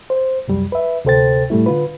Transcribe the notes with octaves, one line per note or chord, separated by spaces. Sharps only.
C5
C2 F#2 G3
B4 E5
D2 C3 A4 C5 G5 A6
A2 G3 A3 E4
D3 F4 B4